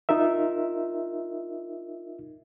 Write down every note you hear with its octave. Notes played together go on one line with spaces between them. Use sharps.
D#4 F4 A#4 E5